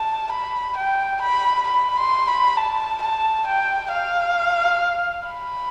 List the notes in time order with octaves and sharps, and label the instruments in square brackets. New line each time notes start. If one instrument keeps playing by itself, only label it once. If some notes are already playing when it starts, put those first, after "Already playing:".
Already playing: [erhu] A5
B5
G5
B5
B5
C6
B5
A5
A5
G5
F5
B5